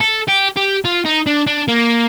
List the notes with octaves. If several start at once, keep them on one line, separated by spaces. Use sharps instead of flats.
A4
G4
G4
F4
D#4
D4
D4
A#3